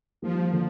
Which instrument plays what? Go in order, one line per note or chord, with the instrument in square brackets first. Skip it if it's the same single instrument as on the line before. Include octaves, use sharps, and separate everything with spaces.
[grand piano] D#3 G3 A#3 [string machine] F3
[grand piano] D3 F3 A#3